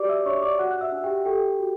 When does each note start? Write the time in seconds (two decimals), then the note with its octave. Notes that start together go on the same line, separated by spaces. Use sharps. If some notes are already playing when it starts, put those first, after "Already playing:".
Already playing: F#4 G4 D5 D6
0.09 E5 E6
0.25 D4 C#5 C#6
0.42 D5 D6
0.59 F#4 F#5 F#6
0.71 F#6
0.81 E5 E6
0.92 D4
1.04 G4 G5
1.25 G4 A4 G5
1.60 F#4